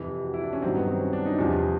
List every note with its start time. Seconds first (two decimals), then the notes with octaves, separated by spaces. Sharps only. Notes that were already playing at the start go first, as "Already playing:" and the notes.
Already playing: F2 C3 E3
0.24 F#4
0.34 E4
0.44 D4
0.53 C#4
0.62 G2 D#3 F#3 C4
0.75 B3
0.88 C4
1.00 C#4
1.13 D4
1.25 D#4
1.38 E2 C3 F3 G#4